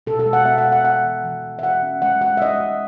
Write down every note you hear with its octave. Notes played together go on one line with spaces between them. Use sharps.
B2 A4
A4
G#3
F#5
B3 E5
F#5
B2
F#5
B3 F#5
E3
E3
E3
E5
E3 F#5
C#4
G#3 F#5
G#3 F#5
E5
G#3 D#5
G#3